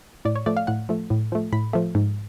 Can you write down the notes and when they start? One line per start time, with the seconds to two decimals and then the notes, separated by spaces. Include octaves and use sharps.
0.25 A2 D5
0.36 C#5
0.46 F3 A3 D5
0.57 F5
0.67 A2 F#5
0.89 F3 A3
1.10 A2
1.32 F3 A3
1.53 A2 B5
1.73 F3 A3
1.95 G#2